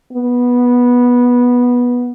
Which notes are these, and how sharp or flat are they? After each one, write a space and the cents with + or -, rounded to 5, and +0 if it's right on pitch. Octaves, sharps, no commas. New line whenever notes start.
B3 -10